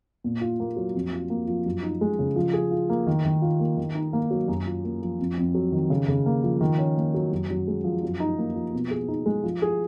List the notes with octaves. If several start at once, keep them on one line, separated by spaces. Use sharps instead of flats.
A#2
F4
A#3
F#3
F2
F4
A#3
F3
F#2
D#4
G#3
C#3
F3
G#4
F4
A#3
D#3
D#3
F4
A#3
D#3
D#4
A#3
F#3
F#2
F4
A#3
F3
F2
F2
F#3
D#3
C#3
C#3
A#3
F3
D#3
C#4
A#3
F#3
F#2
F#2
G#3
F3
F#2
D#4
A#3
F3
B2
G#4
D#4
G#3
F3
G#4